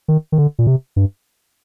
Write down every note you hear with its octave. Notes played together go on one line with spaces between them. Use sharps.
D#3
D#3
D3
A#2
C3
G2